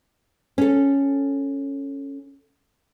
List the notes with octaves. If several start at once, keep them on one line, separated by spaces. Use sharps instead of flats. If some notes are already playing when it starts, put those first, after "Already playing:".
C#4 A4